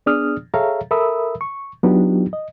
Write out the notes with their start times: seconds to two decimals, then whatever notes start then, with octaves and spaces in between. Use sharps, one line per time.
0.06 B3 D4 G#4 D5 D#6 F6
0.54 G#4 A4 C#5 E5 F5 A#5
0.91 A4 A#4 E5 B5 D#6 E6
1.41 C#6
1.83 F#3 B3 D4 D#4 F4 G4
2.33 D#5